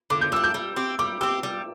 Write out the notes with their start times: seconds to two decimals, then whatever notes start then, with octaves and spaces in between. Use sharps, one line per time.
0.10 D3 D6
0.21 G6
0.32 G3 D4 E6
0.44 G6
0.54 G3
0.76 C4 G4
0.99 G3 D6
1.21 C4 G4 E6
1.43 G3